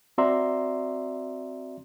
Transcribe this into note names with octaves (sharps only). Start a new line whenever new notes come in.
C4 F#4 D5 E5 A#5 C6